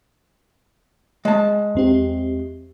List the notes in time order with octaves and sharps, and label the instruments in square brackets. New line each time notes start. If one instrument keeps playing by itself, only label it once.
[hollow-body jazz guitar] G#3 A5
[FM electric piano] E2 C4 G4